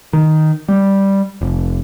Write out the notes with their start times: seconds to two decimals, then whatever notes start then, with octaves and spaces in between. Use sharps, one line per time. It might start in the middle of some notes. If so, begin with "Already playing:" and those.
0.13 D#3
0.68 G3
1.41 F1